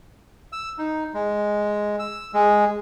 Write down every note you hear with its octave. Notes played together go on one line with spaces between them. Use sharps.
E6
D#4
G#3
E6
G#3